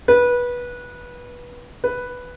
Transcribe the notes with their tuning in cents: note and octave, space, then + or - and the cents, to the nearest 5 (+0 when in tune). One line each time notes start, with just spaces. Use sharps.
B4 -20
B4 +0